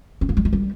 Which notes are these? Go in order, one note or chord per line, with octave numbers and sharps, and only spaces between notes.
C4
A#3
G3
G#3
G3